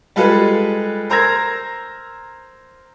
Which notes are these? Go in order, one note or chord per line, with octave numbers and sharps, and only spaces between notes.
G3 G#3 F4 A4 B4
A#4 C5 A#5 E6 G#6 A#6